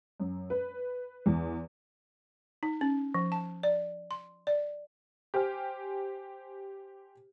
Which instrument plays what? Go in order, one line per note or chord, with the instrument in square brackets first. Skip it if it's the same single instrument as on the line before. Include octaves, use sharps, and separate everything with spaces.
[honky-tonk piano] F#2
B4
E2
[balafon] D#4
C#4
F3
A5
D5
C6
D5
[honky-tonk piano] G4 C5 G#5 F6